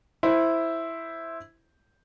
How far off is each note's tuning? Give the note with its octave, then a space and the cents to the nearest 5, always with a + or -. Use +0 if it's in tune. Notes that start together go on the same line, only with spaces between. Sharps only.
E4 +0 C5 +0